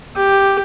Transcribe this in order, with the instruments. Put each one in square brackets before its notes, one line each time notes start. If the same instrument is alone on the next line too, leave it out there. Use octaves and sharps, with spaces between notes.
[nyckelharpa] G4